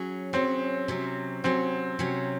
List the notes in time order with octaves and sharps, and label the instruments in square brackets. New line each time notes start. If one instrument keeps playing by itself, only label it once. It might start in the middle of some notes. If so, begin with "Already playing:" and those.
Already playing: [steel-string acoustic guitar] F#3 C#4 G#4
[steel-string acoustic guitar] F#3 C#4 G#4 [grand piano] C4
[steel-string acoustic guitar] C3 F#3 C#4
[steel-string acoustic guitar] C3 F#3 C#4 [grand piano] C4
[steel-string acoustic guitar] C3 F#3 C#4